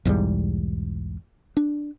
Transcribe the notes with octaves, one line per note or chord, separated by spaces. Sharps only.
B1 E2 G#2 G3
D4